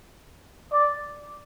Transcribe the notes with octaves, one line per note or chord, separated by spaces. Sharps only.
D5